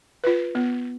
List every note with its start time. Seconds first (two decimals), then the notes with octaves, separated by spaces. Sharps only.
0.24 F4 B4
0.55 B3